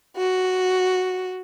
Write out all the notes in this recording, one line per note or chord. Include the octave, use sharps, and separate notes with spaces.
F#4